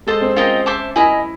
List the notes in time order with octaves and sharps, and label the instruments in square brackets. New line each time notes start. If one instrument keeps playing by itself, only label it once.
[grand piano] G#3 [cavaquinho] A4 C5 D#5
[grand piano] C4
[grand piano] C#4 [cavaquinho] F4 A#4 D#5 G5
[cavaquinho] C5 E5 A5 D6
[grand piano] E4 [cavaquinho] A#4 D#5 G#5 B5